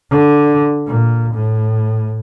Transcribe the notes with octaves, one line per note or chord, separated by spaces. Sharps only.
D3
A#2
A2